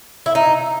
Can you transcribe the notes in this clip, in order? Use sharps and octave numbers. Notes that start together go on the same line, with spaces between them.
E4
D#4